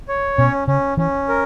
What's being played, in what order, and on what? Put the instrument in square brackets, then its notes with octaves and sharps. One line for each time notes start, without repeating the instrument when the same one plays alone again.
[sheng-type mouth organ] C#5
[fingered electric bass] B2 [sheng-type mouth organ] C#4
[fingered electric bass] C#3 [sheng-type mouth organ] C#4
[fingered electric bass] E3 [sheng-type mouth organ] C#4
[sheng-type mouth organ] A#4